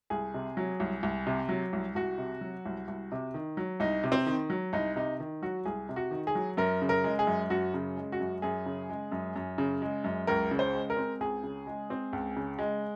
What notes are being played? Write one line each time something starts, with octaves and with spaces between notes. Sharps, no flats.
C2 G#4
C3
F#3
C2
C2
C3
F#3
C2
C2 F#4
C3
F#3
C2
C2
C3
D#3
F#3
C2 D#4
C3
C4
D#3
F#3
C2 D#4
C3 D#4
D#3
F#3 F#4
C2 G#4
C3
F#4
D#3
G#4
F#3
F#2 A#4
C#3
A#4
G#3
G#4
F#2
F#2 F#4
C#3
G#3
F#4
F#2
F#2 G#4
C#3
G#3
F#2
F#2
C#3
G#3
F#2
C#2 A#4
C#3
C5
G#3
A#4
C4
C#2 G#4
C#3
G#3
C4
C#2
C#3
G#3